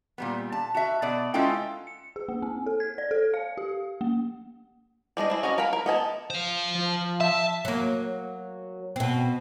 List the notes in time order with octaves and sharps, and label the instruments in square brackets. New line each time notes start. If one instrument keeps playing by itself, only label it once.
[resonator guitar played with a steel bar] A#2 G3 B3
A5
F#4 E5
B2 D5
G#3 C#4 E4 F4 A4 G5
[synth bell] C#7
G#4
A#3
C4
A4
G#6
D5
A4
F5
G4
A#3
[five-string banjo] G3 G#3 D4 D#5
C4 E4
C#4 F#4 A#4 D#5
A#4 F5 F#5 B5
A#4
B3 D#5 G#5 A5
[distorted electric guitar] C5 F5
[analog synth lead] F3
[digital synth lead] E5 [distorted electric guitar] A5
[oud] F#3 A#3
B2 C4